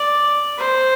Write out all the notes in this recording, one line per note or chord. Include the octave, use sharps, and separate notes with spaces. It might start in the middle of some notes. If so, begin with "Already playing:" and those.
Already playing: D5
C5